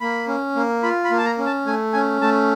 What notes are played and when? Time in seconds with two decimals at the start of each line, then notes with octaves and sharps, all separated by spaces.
0.01 A#3 B5
0.28 C#4
0.56 A#3
0.83 F4 B5
1.05 B5
1.11 A#3
1.18 A5
1.25 A#5
1.38 C#4
1.46 A5
1.66 A3 G#5
1.93 C#4 G#5
2.21 A3 A5